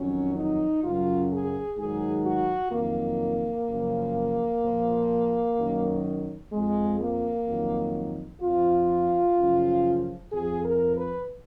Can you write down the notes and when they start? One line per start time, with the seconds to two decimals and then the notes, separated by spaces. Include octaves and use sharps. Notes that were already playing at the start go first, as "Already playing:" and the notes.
Already playing: F2 D#3 F#3 C#4
0.35 D#4
0.82 F#2 C#3 F#3 F4
1.30 G#4
1.77 G#2 D#3 F#3 G#4
2.25 F#4
2.72 F2 D#3 F#3 A#3
3.67 F#2 C#3 F3
4.63 A#2 F3
5.57 F#2 D#3 F#3
6.52 F2 F3 G#3
7.00 A#3
7.47 F2 D#3 F#3
8.41 F2 F3 F4
9.37 F#2 C#3 F3
10.32 F2 F3 G#4
10.63 A#4
10.96 B4